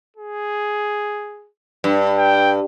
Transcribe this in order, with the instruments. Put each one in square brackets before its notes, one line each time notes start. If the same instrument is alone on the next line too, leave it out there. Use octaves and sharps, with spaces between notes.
[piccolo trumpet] G#4
[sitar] G2
[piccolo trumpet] G5